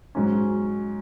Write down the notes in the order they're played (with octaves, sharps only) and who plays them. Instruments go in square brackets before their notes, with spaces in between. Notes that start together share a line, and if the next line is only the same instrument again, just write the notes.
[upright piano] G#2 F#3 C#4